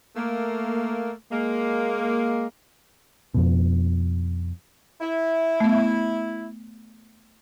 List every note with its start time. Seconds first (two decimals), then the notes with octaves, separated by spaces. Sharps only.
0.17 A3 A#3
1.31 G#3 A#3
3.34 F2 B2
5.01 E4
5.60 A3 B3